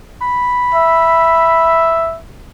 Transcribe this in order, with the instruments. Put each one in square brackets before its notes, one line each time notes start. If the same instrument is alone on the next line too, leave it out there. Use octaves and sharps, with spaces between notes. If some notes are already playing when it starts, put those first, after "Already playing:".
[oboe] B5
[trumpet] E5